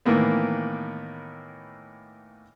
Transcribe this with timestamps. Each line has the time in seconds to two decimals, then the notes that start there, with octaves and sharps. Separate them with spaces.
0.05 A2 D#3 E3 A#3 B3